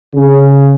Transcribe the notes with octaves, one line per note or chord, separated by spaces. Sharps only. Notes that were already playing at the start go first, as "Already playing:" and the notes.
C#3